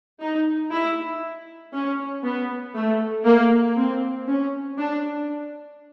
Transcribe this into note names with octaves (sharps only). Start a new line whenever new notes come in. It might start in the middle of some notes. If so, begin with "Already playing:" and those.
D#4
E4
C#4
B3
A3
A#3
C4
C#4
D4